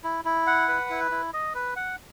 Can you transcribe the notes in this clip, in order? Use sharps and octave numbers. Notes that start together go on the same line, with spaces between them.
E4
E4
F#5
B4
E4
E4
D#5
B4
F#5